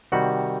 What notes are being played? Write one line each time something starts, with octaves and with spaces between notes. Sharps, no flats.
C3 D#3 G3 F#4 F#5